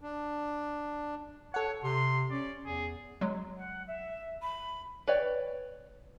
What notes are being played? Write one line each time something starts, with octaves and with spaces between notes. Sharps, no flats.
D4
A4 C#5 F#5
C3 C6
C#4 D5
E2 G#4
F#3 G#3
F#5
E5
B5
B4 C#5 D5 G5